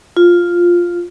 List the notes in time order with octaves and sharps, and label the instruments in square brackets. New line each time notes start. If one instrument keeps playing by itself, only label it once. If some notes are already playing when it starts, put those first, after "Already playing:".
[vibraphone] F4